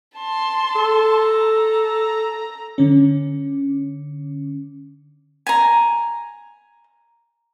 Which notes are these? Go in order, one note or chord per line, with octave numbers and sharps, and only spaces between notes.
A5 C6
A4
A#5
D3 C#4
G#5 A#5